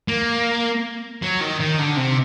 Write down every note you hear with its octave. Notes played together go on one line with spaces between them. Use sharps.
A#3
F#3
D#3
D#3
D3
C3